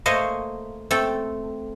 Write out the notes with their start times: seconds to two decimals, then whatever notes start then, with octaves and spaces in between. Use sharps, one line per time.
0.06 A3 A#3 C5 C#5 D#5 F5
0.91 A3 C4 A4 G5